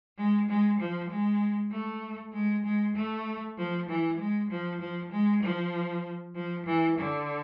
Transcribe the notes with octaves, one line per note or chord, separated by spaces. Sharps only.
G#3
G#3
F3
G#3
A3
G#3
G#3
A3
F3
E3
G#3
F3
F3
G#3
F3
F3
E3
D3